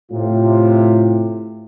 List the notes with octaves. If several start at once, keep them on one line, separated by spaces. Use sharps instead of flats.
A2 C3 F4